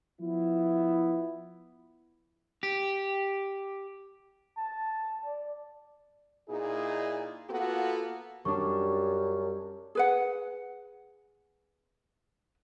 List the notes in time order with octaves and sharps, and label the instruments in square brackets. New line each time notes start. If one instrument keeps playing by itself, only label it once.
[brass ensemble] F3 B3 E4
[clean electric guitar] G4
[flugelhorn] A5
D5
[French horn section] A#2 D#4 E4 G#4
A#3 B3 F4 F#4 A4
[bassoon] F#2 [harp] G3 D4 [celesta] C#6
[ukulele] G#4 B4 F#5